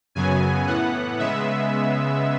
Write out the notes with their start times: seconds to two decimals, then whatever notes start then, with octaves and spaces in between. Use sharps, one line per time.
0.15 F#2 C#3 F#3 B3 G#5
0.67 A2 E3 B3 F#5
1.19 C#3 G#3 B3 E5